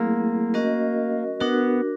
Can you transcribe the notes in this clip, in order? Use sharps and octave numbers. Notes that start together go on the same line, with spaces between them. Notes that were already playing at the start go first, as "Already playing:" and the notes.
Already playing: F#3 A3 A#3 C4 E4 G#4
C#4 F#4 A#4 D#5
B3 D4 F#4 A#4